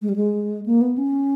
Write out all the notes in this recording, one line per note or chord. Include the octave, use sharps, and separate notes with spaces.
G#3
G3
G#3
A#3
B3
C#4